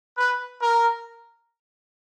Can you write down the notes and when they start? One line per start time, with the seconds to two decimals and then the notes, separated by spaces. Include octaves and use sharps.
0.17 B4
0.60 A#4